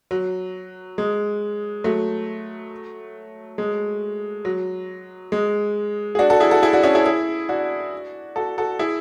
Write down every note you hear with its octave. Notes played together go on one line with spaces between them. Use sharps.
F#3
G#3
F#3 A3
G#3
F#3
G#3
G#4
D4 F#4
F#4 A4
E4 G#4
F#4 A4
E4 G#4
D4 F#4
C#4 E4
E4 G#4
E4 G#4
D4 F#4
F#4 A4
F#4 A4
E4 G#4